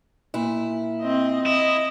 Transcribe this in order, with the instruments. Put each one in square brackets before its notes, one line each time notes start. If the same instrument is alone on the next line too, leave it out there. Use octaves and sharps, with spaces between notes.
[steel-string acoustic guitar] A#2 E4
[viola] C4 D#5
[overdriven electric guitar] E4 [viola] D#5